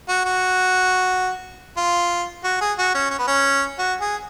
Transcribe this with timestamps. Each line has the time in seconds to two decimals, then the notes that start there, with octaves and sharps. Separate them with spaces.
0.08 F#4
0.25 F#4
1.77 F4
2.44 F#4
2.61 G#4
2.78 F#4
2.95 C#4
3.11 C#4
3.19 B3
3.27 C#4
3.78 F#4
4.01 G#4